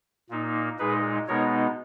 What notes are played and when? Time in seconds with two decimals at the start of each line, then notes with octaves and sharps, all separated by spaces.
0.30 A#2 A#3 D#4
0.78 A#2 G#3 D#4 G#4 B4
1.28 B2 G#3 B3 D#4 A#4 C#5